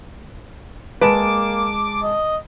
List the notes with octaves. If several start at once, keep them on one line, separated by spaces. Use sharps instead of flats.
G#3 A#3 B4 A5 D6 E7
D#5